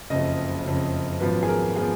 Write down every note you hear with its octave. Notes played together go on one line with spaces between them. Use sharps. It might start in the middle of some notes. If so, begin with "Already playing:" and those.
F#1 F2 C#3 D#5
F#1 F2 C#3
G#1 F#2 F3 B3 B4
G#4
A#4
F3 B3 G#4